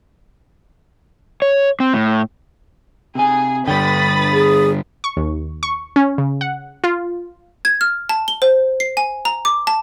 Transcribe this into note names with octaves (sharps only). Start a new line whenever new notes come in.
C#5
C4
A2
C3 G#4 G#5
G2 D3 B4 C#5 G5 B5 D#6 A6
G#4
C#6
D#2
C#6
C#4
C#3
F#5
F4
G#6
F6
A5
G7
C5
C7
G#5
A#5
D6
A5